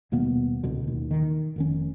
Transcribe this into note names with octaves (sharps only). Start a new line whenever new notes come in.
D#1 B2 A#3 B3
D1 C#2 B2 D3
D1 D#2
D#3
F1 D#3 C#4